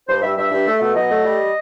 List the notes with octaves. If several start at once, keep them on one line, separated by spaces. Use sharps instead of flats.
G2 C5
G2 E5
G2 E5
G2
A3
B2
F#3 D#5
A3
G3